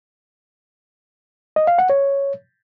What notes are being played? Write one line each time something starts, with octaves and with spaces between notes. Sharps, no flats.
D#5
F5
F#5
C#5